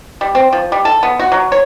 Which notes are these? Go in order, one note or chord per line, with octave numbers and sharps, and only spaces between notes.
G3
C4
F3
G3
A4
B3
F#4
F#3
C#5